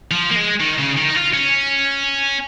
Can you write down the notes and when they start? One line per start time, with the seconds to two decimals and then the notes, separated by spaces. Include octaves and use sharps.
0.11 F3
0.31 A#3
0.36 G#3
0.60 D#3
0.78 C#3
0.96 D#3
1.09 D#4
1.15 F4
1.34 C#4